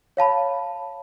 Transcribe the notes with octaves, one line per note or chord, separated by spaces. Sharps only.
C#5 F5 A5 B5